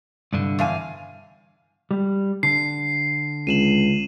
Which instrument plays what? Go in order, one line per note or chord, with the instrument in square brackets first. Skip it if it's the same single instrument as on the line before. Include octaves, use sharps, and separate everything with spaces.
[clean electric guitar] C2 G2 D3
[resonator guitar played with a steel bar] E2 F5 G#5
[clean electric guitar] G3
[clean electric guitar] D3 [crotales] C7
[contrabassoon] C#2 [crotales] D#7 E7 F#7